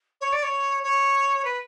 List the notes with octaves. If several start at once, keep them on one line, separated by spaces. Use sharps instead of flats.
C#5
D5
C#5
C#5
B4